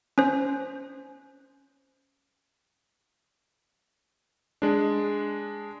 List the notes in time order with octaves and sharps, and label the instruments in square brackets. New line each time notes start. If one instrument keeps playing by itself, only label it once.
[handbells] C#4 C5
[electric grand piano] G#3 D4